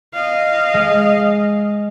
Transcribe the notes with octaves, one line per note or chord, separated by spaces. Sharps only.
D#5 F5
G#3